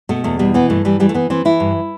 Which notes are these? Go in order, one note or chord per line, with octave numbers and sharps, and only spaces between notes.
B2 A3
E2 A3
B2 G3
E3 B3
G2 A3
E3 G3
E3 G3
A3
E3 B3
E3 C4
E3 E4
G2